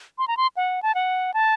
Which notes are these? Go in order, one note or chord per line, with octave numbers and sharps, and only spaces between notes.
C6
A#5
C6
F#5
A5
F#5
A5